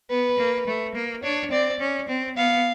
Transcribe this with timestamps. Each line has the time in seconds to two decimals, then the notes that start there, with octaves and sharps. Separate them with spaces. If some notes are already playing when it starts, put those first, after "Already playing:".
0.10 B3 B4
0.38 A#3
0.67 A3
0.95 A#3
1.23 D4 C#5
1.51 C4 D5
1.80 C#4
2.08 C4
2.37 B3 F5